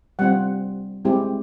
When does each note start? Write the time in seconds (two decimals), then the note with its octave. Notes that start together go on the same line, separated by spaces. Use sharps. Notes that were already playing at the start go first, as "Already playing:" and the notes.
0.19 G3 C4 F4 F#5
1.05 G#3 C4 E4 G4